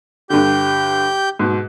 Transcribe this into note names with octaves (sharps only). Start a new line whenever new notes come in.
G2 D3 G4 G6
G#2 B2